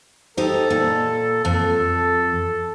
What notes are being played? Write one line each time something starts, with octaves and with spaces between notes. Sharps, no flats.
D#4 G4 A4 C5
A#2
F2 A4